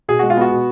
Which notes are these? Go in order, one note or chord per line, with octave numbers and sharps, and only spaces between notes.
B2 G#4
G#3 F#4
F4
B3 F#4
B2